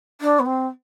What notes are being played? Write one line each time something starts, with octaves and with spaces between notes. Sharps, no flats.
D4
B3
C4